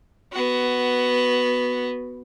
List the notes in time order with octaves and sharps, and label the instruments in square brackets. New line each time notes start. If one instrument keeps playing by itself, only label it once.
[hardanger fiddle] B3 F#4